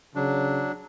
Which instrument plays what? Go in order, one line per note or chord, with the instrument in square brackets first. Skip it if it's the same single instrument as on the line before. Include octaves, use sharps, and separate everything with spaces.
[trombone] C#3 [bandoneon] F#3 D4